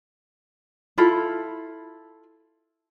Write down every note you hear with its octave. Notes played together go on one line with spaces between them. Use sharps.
E4 F4 A4 B5